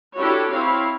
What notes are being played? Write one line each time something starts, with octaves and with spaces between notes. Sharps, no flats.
D4 E4 F#4 G4 A4 C#5
C4 E4 C#5 F5